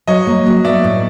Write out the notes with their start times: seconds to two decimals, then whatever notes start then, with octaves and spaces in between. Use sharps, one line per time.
0.08 F#3 C#5 D#5
0.27 A#3
0.46 F#3
0.65 B3 D5 E5
0.84 A2